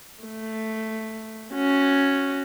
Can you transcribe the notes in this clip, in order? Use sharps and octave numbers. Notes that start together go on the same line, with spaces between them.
A3
C#4 F#4